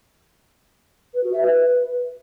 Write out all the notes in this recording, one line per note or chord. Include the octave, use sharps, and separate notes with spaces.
B4
F#4
E5
B4